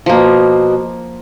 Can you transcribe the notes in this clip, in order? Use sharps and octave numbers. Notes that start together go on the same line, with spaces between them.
B2 F3 A#3